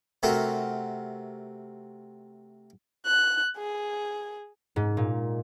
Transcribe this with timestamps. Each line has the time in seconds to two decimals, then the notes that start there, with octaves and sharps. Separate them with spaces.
0.23 C3 A3 F#4 A#4
3.06 F#6
3.58 G#4
4.76 G#2
4.97 A#2